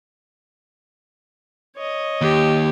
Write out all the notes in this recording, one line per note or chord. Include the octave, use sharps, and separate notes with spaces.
C#5 D#5
D#2 G4